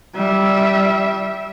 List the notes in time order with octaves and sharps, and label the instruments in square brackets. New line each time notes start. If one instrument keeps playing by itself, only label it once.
[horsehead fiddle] G3 E5